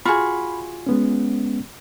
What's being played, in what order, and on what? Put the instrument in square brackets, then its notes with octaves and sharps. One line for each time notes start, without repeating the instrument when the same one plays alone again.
[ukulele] F4 F#4 G#4 [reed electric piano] B5
[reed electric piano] G#3 B3 C#4